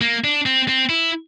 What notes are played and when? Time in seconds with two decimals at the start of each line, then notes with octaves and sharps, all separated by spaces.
0.01 A#3
0.24 D4
0.46 C4
0.68 C4
0.89 E4